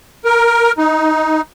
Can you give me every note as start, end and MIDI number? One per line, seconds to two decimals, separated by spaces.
0.25 0.72 70
0.78 1.41 63